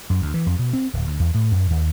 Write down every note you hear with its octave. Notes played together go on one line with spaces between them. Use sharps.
F#2
D2
E3
F2
B2
C4
D1
D2
E2
A2
F#2
D#2